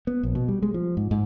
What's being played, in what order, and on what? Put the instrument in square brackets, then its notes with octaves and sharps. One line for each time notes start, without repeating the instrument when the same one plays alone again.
[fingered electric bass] B3
A#1
B2
G3
G#3
F3
G#2
G#2